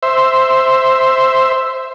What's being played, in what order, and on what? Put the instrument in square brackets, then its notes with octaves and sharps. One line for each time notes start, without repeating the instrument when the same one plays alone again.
[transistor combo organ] C5 E5